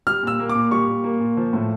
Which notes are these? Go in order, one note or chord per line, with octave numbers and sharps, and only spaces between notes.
G3 F6
A#2 E6
A#3
D6
A#2
G3 C#6
A#2
A#3
A#2
F3
A2